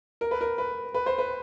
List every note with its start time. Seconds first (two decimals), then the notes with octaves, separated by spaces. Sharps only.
0.21 A#4
0.31 B4
0.41 A#4
0.58 B4
0.94 B4
1.06 C5
1.18 B4